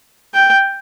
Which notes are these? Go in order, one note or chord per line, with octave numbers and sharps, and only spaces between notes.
G5